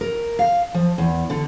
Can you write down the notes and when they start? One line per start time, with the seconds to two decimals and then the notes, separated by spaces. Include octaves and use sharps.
0.01 A#4
0.39 F5
0.74 F3
0.98 E2
1.30 D3